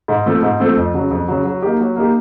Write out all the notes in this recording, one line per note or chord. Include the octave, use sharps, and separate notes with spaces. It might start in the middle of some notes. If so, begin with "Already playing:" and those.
G#2
F3 A3 C4
G#2
F3 A3 C4
F2
C#3 F#3
F2
C#3 F#3
F#3
A#3 D#4 G4
F#3
A#3 D#4 G4